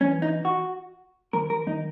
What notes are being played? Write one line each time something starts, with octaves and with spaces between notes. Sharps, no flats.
E3 C#4
D#4
F#4
D#3 A#4
A#4
D#3 D#4